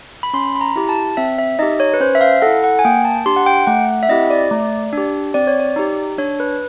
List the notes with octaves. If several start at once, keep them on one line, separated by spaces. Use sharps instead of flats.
B5
C#4 C6
B5
A#5
E4 G4
A5
C4 E5
E5
D#4 G4 D#5
C#5
B4
C#4 C5
E5
F5
E4 A4 F#5
F#5
G#5
A#3 G5
A5
D4 G4 C6
F#5
G5
A3 F#5
F#5
E5
C4 E4 G4 D#5
D5
A3
D4
G4
C4 D5
C#5
D5
D#4 G4
D4 C#5
B4